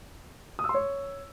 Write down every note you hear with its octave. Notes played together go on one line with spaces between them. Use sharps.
D#6
E6
C6
C#5